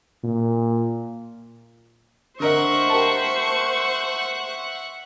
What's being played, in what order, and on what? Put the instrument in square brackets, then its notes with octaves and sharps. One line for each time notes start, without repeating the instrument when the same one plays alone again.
[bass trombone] A#2
[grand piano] D3 A#4 D#5 [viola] C5 C#6 [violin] E5 F#5
[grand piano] G4 A#4 A5